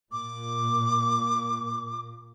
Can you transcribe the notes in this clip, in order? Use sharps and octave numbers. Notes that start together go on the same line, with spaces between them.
A#2 D6